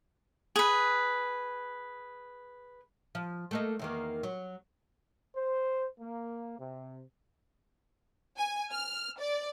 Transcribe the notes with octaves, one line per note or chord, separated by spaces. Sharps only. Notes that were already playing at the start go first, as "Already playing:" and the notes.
G#4 B4
F3
A3 A#3 D#5
E2 D#3 A#3
F#3
C5
A#3
C3
G#5
F6
D5